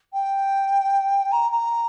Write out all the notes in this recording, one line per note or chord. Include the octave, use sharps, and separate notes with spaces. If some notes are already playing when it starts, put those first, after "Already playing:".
G5
A#5
A#5